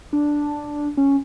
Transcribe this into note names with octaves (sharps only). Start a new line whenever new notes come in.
D4
C#4